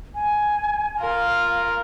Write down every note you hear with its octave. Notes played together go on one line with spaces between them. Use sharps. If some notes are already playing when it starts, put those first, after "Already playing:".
G#5
F4 A#4 F5